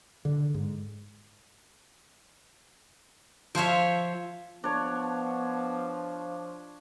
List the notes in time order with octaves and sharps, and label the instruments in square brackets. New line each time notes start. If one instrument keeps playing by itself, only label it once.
[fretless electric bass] D3
G#2
[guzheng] F3 C5 C#5 E5
[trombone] F3 [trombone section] B3 [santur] D4 C#5